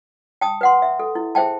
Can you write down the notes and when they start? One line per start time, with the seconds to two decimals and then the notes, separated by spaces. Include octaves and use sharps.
0.41 G5 A5 D#6
0.61 B4 F#5 C6
0.82 E5
1.00 A4
1.15 E4
1.35 G#4 C5 E5 G5 A5